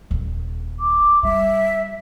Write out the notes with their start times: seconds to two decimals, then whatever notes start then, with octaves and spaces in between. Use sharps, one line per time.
0.11 D#1
0.80 D6
1.23 G3 E5